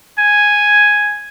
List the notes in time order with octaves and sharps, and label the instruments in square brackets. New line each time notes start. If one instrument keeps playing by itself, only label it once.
[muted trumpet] G#5